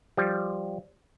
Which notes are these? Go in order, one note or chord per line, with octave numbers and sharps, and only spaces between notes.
F3 G3